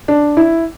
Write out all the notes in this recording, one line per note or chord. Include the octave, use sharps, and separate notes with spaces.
D4
E4